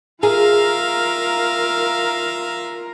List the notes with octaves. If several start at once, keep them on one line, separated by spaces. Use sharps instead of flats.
F4 G#4 A#4 E5 F5 A#5